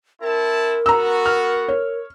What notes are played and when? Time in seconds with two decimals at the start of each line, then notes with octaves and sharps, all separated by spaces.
0.22 C4 E4 A#4 A5
0.86 B3 F#4 A#5 E6
1.26 F6
1.68 C#5